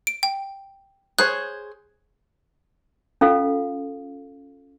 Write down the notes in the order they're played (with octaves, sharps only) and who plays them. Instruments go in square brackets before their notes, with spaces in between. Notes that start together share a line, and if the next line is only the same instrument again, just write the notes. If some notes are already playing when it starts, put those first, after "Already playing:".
[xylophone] D7
G5
[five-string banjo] G#4 C5 C#5 [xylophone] F#6
[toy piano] C#4 F4 A4 F5